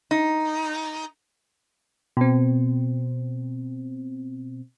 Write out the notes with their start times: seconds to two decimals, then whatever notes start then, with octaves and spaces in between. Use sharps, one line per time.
0.11 D#4
2.17 B2 C4